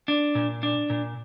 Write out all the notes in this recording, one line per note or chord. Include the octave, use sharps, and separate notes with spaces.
D4
A#2
D4
A#2